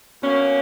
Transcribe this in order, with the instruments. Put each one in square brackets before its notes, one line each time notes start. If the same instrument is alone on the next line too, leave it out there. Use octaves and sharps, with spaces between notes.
[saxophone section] B2 A#3 C#4